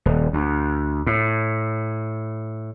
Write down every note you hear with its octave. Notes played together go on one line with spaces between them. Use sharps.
D#1
D2
A2